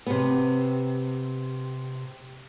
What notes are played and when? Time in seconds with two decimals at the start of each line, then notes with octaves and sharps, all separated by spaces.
0.07 C3 B3